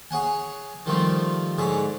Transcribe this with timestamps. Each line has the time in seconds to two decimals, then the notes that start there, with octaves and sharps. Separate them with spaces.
0.11 G#4 C#5 F#5 G#5
0.86 D#3 F3 G3 A3 C4 F4
1.58 G#2 D3 G#4 C#5 B5